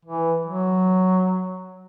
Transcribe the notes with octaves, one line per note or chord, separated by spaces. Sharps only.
E3
F#3